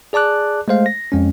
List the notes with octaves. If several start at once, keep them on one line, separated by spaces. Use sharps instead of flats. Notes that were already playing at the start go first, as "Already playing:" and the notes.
G#4 D5 A5 D6 F#6
G#3 A3 C5 F5
A#6
F2 G#3 C#4